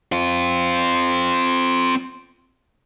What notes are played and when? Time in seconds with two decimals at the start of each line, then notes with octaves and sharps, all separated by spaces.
0.12 C4 F4